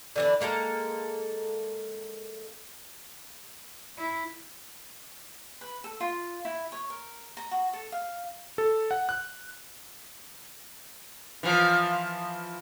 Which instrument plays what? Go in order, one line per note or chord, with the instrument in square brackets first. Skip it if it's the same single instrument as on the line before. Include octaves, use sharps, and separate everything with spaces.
[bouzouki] D3 E3 D4
G#3 A#3 A4 A#5
[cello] E4
[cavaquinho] B4
A4
F4
E4
C#5
A#4
A#5
F#4
A4
F5
[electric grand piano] A4
F#5
F#6
[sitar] E3 F3